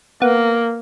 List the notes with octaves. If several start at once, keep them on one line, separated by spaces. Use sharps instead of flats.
A#3 B3